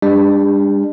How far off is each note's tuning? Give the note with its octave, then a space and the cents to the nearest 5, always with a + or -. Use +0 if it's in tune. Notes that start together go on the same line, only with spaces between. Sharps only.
G3 +40 D4 +0